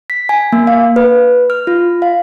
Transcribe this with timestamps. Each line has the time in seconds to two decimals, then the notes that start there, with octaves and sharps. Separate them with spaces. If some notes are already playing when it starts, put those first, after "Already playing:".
0.10 B6
0.29 G#5
0.52 A#3
0.67 F5
0.96 B4
1.50 F6
1.67 F4
2.02 F5